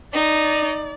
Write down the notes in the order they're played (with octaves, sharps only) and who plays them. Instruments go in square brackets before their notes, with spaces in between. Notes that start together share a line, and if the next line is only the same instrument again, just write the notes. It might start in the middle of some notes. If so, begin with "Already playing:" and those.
[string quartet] D#4 [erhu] D5